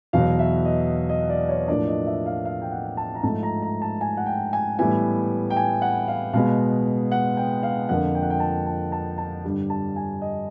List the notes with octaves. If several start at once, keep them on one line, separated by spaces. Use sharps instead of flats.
E2 B2 F#3 F5
E5
D#5
D#5
D5
C#5
A2 F3 A#3 D4 D5
D#5
E5
F5
F5
G5
F#5
A5
A#5
G#2 F3 A3 A5
A#5
A#5
A5
G#5
F#5
G5
G#5
A2 E3 G3 B3 E4 G#5
G5
G#5
F#5
F5
B2 G#3 B3 F5
F#5
G5
F5
F2 D3 F3 A#3 F#5
G5
F#5
G5
A5
A5
A5
A5
G2 D3 G3
A5
G#5
D#5